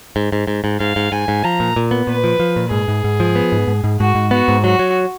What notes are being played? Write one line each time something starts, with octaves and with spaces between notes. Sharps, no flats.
G#2
G#2
G#2
G#2
G#2 F5
G#2
G#2 G#5
G#2
F3 A#5
A#2
A#2
B3
A#2 B4
F3
F3
A#2
G#2 G#4
G#2
G#2
F3
B3
G#2
G#2
G#2
G#2 F#4
G#2
B3 F#4
G#2
F#3 F#4
F#3